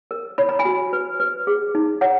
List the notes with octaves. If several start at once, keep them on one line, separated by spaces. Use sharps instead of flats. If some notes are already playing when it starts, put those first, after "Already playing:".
A#4
C#5 B5
A#5
G#5 B5
F#4
B4
B4
G#4
D#4
C#5 F#5 A#5